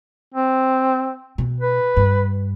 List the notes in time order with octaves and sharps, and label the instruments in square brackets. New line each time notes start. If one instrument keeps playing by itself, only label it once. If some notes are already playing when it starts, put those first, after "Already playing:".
[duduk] C4
[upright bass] B2
[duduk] B4
[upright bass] G2